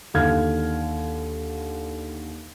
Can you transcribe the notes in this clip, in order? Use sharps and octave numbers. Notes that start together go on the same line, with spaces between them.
D#2 D3 F5 F6 G#6